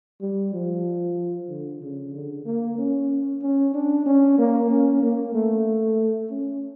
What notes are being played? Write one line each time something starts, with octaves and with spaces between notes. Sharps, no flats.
G3
F3
D3
C#3
D3
A#3
C#4
C#4
D4
C#4
A#3
C#4
A#3
A3
C#4